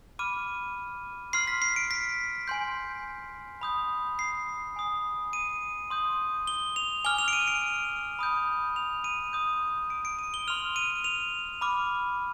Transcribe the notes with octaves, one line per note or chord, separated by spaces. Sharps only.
B5 D6 F6 D#7
C6 F6 C7
B6
C7
D7
B6
G#5 C6 G6
B5 D#6 G6
C7
G#5 B5 D#6
D#7
C6 D#6 G6
G7
F7
G#5 D6 F6 G7
F7
D7
D#7
D7
B5 D#6 G6
F7
D#7
C6 D#6 G6
D7
D7
D#7
G7
C6 F6 F7
D#7
F7
B5 D6 F6